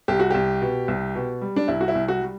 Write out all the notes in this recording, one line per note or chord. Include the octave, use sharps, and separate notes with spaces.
C2 G4
F#4
C2 G4
B2
C2
B2
G3
D4
C2 E4
F#4
E4
C2
F#4
G3